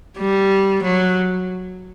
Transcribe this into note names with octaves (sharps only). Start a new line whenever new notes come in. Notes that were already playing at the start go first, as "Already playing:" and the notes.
G3
F#3